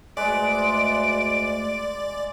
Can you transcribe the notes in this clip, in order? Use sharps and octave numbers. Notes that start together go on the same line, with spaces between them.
D2 G#3 B4 D5 D7